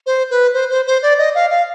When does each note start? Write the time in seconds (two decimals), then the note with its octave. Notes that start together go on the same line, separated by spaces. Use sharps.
0.06 C5
0.30 B4
0.53 C5
0.70 C5
0.87 C5
1.02 D5
1.18 D#5
1.35 F5
1.50 F5